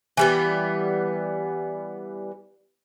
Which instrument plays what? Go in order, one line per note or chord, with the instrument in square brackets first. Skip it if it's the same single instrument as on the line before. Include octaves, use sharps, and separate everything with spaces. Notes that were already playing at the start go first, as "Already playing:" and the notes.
[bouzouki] E3 G3 B3